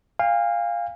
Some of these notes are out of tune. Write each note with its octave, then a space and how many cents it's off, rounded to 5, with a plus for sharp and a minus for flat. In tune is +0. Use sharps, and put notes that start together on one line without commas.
F5 +0 G#5 -45